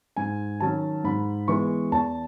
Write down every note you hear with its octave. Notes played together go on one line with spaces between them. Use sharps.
G#2 G#5
D#3 F#3 C#4 A5
G#2 B5
E3 G#3 B3 C#6
E2 A5